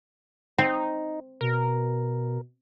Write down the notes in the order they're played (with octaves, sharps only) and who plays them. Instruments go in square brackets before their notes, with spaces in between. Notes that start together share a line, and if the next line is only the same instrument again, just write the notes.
[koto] C4 [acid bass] D#4
[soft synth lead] B2 [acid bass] A#4